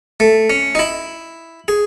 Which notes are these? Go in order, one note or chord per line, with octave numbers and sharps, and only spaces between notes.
A3
C#4
D#4
E4
G#4